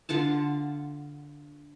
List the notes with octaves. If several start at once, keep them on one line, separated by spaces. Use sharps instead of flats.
D3 F4 F#5 A5